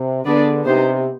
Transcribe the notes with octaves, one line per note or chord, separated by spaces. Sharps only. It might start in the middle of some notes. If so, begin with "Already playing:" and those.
Already playing: C3
D3 B3 D4 G#4 B4 D5
C3 B3 D#4 G4 C5